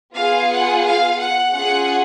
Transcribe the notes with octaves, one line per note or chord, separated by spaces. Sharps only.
B3 F4 G#4 F5
F#5
F5
F#5
C#4 F4 G#4 F#5